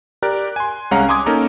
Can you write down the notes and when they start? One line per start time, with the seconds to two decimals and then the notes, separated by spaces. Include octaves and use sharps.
0.23 G4 A#4 D5 F#6
0.56 G#5 C6
0.91 C2 G#3 C#4 F5 F#5 A#5
1.09 G#5 C6 D6 D#6 G#6
1.26 A#3 C#4 D#4 A4 A#4